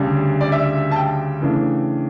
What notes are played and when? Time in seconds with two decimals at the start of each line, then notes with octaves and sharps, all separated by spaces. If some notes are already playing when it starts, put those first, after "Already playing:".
Already playing: D2 C#3 G3 D4
0.41 D5
0.52 E5
0.91 A5
0.96 G5
1.41 C#3 E3 A3 D4